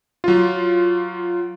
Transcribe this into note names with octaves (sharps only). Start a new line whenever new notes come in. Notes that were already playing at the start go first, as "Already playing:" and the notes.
F#3 F4